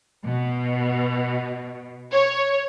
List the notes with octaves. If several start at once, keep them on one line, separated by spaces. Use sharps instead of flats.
B2
C#5